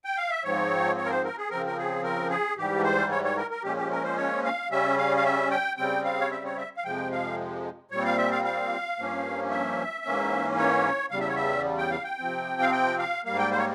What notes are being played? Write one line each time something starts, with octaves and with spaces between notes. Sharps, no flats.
G5
F5
E5
G#2 F3 C4 C#5
C#5
A#4
C5
A#4
G#4
C#3 F3 C4 A#4
A#4
G#4
A#4
G#4
G#2 E3 G3 G4
C5
C#5
C#5
A#4
A#4
A#2 F3 G#3 C#4 G4
G4
A#4
C5
C#5
F5
C#3 G3 C#4 E5
F5
F5
E5
G5
C#3 G3 C4 G5
F5
C#5
E5
C#5
E5
F5
F2 C3 F3 G#3 G5
F5
A#2 G3 C4 C#5
F5
E5
F5
F5
G2 F3 A#3 C#4
E5
G#2 E3 A#3 C#4
C#5
E2 C#3 G3 F5
E5
C#5
E5
G5
F5
G5
C3 F3 C4
F5
G5
F5
G#2 G3 A#3 F5
G5
C5
C#5